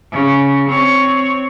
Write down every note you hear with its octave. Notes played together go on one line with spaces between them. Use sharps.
C#3
C4 C#5